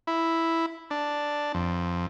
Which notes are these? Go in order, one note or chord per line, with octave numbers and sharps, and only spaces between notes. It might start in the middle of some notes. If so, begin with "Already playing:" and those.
E4
D4
F2